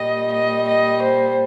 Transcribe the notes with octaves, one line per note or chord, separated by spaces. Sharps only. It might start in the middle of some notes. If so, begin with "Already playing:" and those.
Already playing: A#2 G3 D#5
D#5
D#5
C5